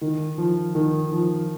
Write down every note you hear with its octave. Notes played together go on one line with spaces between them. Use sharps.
D#3
F3
D#3
F3